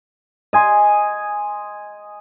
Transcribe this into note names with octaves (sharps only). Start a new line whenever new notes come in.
D#5 G#5 C6